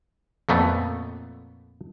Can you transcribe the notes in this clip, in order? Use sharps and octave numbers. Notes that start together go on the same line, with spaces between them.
F2 A#2 A3 B3